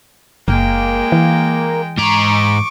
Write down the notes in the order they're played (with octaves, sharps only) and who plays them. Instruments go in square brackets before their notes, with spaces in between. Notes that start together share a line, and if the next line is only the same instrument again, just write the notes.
[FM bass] F#1 [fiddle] G#3 G5 [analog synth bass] A#3
[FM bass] E3
[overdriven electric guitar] G#2 A#5 [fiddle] C#6 D6